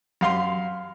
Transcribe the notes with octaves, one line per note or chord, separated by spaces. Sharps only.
F#2 F5 C6